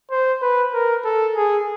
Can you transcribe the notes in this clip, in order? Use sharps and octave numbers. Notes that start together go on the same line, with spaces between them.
C5
B4
A#4
A4
G#4